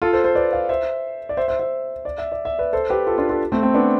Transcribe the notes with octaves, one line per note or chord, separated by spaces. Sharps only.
F4 A4
A4 C5
A4 C5
B4 D5
D5 F5
C5 E5
D5
C5 E5
C5 E5
C5 E5
D5
E5
D5
E5
B4 D5
A4 C5
G4 B4
F4 A4
D4 F4
F4 A4
A3 C4
A3 C4
B3 D4